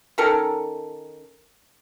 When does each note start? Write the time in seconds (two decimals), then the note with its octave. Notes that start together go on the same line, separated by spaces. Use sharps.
0.18 D#3 C#4 A4 A#4